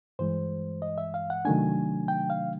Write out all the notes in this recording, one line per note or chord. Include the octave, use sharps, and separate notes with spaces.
G2 E3 G#3 C5
D#5
E5
F5
F#5
C3 D#3 F#3 A3 D4 G#5
G5
F5